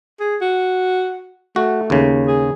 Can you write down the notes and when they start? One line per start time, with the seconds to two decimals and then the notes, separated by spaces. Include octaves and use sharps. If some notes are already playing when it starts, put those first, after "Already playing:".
0.20 G#4
0.41 F#4
1.56 A3 F#4
1.90 D#2 C#3
2.27 G#4